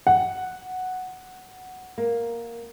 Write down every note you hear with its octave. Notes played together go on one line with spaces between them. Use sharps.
F#5
A#3